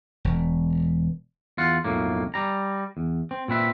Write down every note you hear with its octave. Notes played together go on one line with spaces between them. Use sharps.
E1
E2 F4 F#5
B1 F2 A2 A#3
G3 A#5
E2
C4
A#2 C4 B4 E5